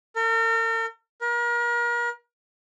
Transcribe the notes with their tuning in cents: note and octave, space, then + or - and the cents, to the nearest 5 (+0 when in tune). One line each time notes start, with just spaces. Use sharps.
A#4 -45
A#4 +35